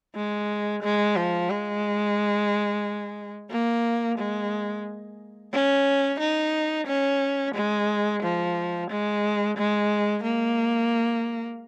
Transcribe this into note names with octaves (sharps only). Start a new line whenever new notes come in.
G#3
G#3
F3
G#3
A#3
G#3
C#4
D#4
C#4
G#3
F3
G#3
G#3
A#3